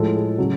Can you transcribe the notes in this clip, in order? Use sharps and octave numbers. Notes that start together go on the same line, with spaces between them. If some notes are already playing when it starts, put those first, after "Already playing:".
Already playing: A2 F3 G#3 A4
G#4
C#3 F#3